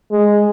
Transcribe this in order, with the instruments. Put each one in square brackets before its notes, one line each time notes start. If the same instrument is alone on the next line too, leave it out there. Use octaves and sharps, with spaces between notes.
[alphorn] G#3